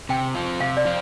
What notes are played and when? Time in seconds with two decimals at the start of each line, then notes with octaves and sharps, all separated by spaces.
0.09 C3 G5
0.35 F3 C4 F4
0.60 C3 F5
0.77 D5
0.85 F3 C4 F4